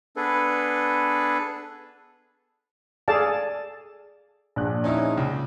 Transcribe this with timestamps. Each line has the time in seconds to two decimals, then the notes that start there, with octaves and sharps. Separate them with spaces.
0.16 B3 D4 G#4 A4 B4
3.08 G#4 A4 D5 F5 A5
4.56 A#1 D4 F#6
4.84 C#4 D#4 E4
5.17 C#2